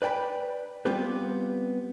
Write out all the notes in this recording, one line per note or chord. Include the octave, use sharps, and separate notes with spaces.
B4 D5 G5 G#5 B5
G3 B3 C4 F4 G4 B4